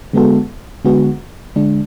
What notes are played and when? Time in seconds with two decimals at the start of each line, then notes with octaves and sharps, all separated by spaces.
0.13 D3 G#3 B3 F#4 A4
0.85 D3 G#3 B3 F#4
1.56 D3 G#3 D4